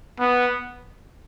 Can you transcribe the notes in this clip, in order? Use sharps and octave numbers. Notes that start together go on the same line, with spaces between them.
B3